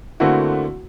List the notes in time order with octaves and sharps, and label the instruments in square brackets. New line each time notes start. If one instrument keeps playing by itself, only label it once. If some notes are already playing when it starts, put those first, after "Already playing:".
[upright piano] D3 A3 A#3 C4 E4 F#4